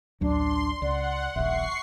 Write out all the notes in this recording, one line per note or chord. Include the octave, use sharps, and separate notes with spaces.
A1 D2 F#3 D4 C6
C#2 D5 F#5
D#1 A#1 E5 C#6 C7